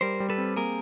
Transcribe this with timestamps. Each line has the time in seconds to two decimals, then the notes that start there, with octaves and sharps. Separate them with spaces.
0.01 G3 A#4 C5
0.20 G3
0.30 A4 B4
0.38 C4
0.56 A#3 G#4 A#4